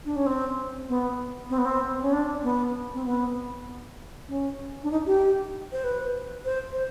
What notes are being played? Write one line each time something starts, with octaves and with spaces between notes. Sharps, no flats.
D4
C#4
C4
B3
C4
B3
C4
C4
C#4
D4
B3
C4
B3
C#4
D4
D#4
G4
C5
B4
C5
C5